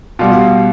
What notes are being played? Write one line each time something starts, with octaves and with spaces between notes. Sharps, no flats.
B2 G3 F4